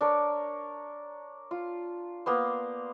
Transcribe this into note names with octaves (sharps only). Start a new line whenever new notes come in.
D4 A#4 C#5
F4
A#3 B3 C5